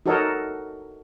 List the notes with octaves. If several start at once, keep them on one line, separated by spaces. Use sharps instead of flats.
D#4 F#4 A4 A#4 C#5 D#5